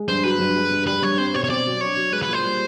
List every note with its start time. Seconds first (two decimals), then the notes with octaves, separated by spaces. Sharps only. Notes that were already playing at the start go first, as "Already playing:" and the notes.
Already playing: G#3
0.08 G2 C5
0.24 F#3 B4
0.39 G2
0.55 G#3
0.71 G2
0.87 G3 B4
1.02 G2 C#5
1.18 C4 C5
1.34 B2 C#5
1.44 C#5
1.50 C4 D5
1.66 F#3
1.81 D4 C#5
1.96 F#3
2.12 G#3 B4
2.23 B4
2.29 A#2 C5
2.45 G3